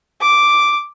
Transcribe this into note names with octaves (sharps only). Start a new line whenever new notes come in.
D6